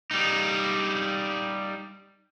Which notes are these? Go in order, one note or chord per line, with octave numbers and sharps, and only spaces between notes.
G3 D#4